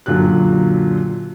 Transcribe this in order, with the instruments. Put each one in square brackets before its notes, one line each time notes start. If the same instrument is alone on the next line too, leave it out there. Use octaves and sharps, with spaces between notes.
[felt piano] F#2 A#2 D3 F#3 G4 F#6